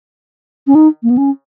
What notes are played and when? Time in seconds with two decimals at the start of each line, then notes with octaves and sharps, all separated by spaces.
0.67 C#4
0.75 D#4
1.03 A#3
1.10 B3
1.17 C#4